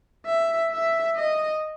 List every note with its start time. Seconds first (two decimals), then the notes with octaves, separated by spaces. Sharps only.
0.26 E5
0.72 E5
1.16 D#5